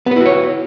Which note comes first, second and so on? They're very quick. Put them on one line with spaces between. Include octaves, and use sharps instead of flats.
B3 B4 E4 F#4 C#5